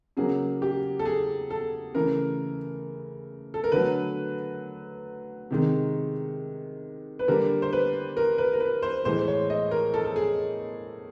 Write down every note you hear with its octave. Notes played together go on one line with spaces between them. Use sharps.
C#3 F#3 A#3 G#4
G4
A4
G#4
A4
C#3 E3 A3 A#4
A4
A#4
D3 F#3 A3 B4
C3 D#3 G#3
B4
D3 G3 A#3 A#4
C5
B4
A#4
B4
A#4
B4
C5
A2 E3 G#3 C5
C#5
D#5
A#4
A4
A4
G#4